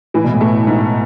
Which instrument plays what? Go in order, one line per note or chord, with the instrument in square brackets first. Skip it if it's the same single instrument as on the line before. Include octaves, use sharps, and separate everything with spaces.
[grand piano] A2 [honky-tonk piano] E3
[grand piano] B2
A2
[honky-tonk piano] A3
G#2